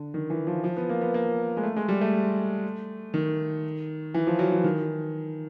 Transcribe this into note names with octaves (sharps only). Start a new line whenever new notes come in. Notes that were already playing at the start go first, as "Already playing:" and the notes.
Already playing: D3
D#3
E3
F3
F3
B3
A#3
B3
A#3
G#3
A3
G#3
G3
A3
D#3
E3
F3
F#3
E3
D#3